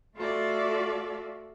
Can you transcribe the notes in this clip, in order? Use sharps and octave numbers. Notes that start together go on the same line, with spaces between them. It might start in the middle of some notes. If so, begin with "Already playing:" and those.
A3 F4 F#4 A4 D5 E5